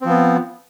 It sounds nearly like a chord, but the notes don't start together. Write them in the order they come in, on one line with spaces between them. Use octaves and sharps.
C4 F3 B3